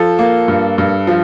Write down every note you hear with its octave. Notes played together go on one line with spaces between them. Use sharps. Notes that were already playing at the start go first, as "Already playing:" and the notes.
Already playing: F3 A4
A#3
G2
G2
F3